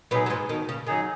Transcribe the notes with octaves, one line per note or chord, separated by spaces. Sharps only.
B2 F#3 B3 D#4 G#4
F#3
G#2 G#3
B2 D#3
C#3
D#3 F#3 D#4 G#4